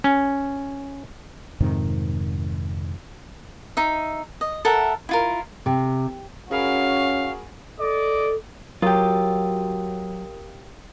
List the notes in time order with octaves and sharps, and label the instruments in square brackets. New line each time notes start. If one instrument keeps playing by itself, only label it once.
[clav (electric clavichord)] C#4
[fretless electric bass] F2 G#2 C3 D#3
[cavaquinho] D#4 E5
D#5
A4 A#4 E5 F#5
E4 F4 A#4
[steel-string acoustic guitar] C3
[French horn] C#4 [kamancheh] F#4 [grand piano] G#4 A#4 B5 [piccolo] F5
[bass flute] A4 [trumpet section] D5 D#5 D6
[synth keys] F#3 [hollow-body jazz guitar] F4 G4 [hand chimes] A#4 D#6